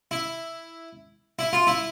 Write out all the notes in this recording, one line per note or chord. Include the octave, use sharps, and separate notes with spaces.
E4
E4
F4
E4